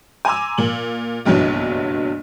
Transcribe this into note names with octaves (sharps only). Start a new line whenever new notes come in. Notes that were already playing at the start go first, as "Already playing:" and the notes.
G#5 A#5 C6 D6 E6
A#2 F#7
F#1 B1 G2 E3 F#3